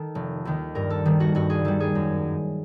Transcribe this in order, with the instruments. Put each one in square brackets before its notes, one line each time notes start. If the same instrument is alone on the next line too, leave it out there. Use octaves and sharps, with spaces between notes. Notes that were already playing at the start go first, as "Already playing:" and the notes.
Already playing: [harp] D#3 A4
F1
D#2 D#3
G2 A#4
A4
D#3 G3
F#4
G2 F#4
G#4
D#3 G3 A4
G#4
F#2